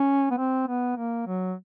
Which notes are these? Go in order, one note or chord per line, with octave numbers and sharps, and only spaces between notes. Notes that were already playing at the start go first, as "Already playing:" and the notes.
Already playing: C#4
B3
C4
B3
A#3
F#3